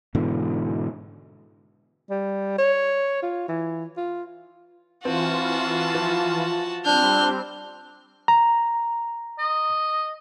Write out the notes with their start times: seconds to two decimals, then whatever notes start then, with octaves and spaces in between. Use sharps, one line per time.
0.15 G#2 B2 D3 E3
2.10 G3
2.58 C#5
3.22 F4
3.48 E3
3.97 F4
5.05 E3 C4 F4 F#4 A5
5.95 F3
6.86 G3 C4 D4 F6 G6
8.28 A#5
9.39 D#5